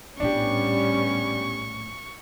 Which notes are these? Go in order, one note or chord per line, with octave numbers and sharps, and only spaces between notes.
A#1 A2 G3 B3 C#4 D4 G4 C#6